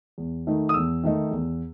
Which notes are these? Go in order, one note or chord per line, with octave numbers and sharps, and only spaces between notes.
E2
D#3 A3 D#4
D#6
E2 E6
D#3 A3 D#4
E2